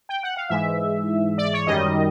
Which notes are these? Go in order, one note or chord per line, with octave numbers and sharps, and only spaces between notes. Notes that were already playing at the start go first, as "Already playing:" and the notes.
G5
F#5
F5
G#2 E3 G#3 E5
D5
C#5
F#2 D#3 G3 D#5